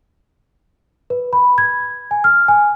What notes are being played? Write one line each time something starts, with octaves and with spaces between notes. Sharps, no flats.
B4
B5
G#6
G#5
F6
G#5